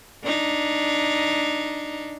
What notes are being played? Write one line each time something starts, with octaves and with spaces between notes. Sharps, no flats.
D4 D#4